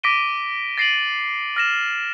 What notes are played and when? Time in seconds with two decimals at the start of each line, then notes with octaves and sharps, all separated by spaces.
0.03 D6 A#6 B6 D7 D#7 G7
0.78 A6 A#6 C7 D7 D#7 F#7
1.56 F6 A#6 E7